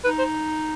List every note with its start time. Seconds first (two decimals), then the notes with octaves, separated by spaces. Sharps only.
0.04 D#4 B4
0.19 C5